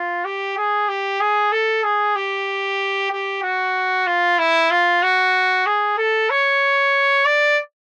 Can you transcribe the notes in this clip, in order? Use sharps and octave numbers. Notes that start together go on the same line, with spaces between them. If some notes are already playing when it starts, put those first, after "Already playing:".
Already playing: F4
G4
G#4
G4
G#4
A4
G#4
G4
G4
F#4
F4
E4
F4
F#4
G#4
A4
C#5
D5